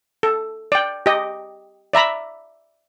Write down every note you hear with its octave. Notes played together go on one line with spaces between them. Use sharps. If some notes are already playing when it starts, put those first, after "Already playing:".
A4
D5 G5
G4 D#5
D5 E5 A#5 B5